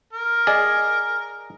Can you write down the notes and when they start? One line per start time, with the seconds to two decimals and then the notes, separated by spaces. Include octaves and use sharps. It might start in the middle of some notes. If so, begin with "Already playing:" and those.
0.13 A#4
0.47 G#4 D5 D#5